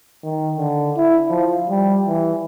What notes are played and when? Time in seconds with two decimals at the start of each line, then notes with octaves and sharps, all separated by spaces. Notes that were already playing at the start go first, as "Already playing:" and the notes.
0.23 D#3
0.57 D3
0.97 E4
1.30 F3
1.69 G3
2.08 E3